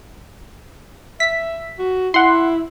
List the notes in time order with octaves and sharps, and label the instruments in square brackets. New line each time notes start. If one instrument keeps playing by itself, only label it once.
[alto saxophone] E5 [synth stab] B6
[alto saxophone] F#4
[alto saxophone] E4 [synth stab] F#5 C6